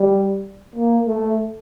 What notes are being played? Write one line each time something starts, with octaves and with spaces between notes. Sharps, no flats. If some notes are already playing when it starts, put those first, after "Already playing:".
Already playing: G3
A#3
A3